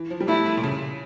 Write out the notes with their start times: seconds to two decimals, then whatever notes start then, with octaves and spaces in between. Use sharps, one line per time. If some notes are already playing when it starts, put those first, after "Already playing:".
Already playing: E3
0.10 F3
0.20 G3
0.28 A3 E4
0.46 A3
0.57 A#2
0.63 C#3